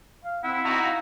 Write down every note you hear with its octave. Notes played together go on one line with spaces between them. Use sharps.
F5
C4 E4 F#5
C4 D#4 F#4 A#5
F5